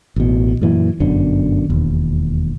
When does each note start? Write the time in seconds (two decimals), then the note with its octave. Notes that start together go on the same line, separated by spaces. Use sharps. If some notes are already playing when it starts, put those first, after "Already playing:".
0.16 A1 B2
0.61 F#2 A#2 E3
1.00 G1 F#2 B2 D3
1.70 E1 D#2